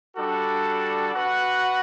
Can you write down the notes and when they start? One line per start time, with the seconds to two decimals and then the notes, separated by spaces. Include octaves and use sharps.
0.16 G3 D4 F#4 A4
1.14 F#4 B4 F#5